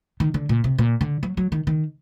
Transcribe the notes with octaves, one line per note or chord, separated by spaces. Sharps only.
D#3
D3
A#2
C3
A#2
D3
F#3
F#3
D#3
D#3